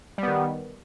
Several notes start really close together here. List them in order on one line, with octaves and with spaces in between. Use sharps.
G3 B3 D#3